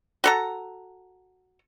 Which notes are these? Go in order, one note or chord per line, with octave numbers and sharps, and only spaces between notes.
F#4 A4 A#5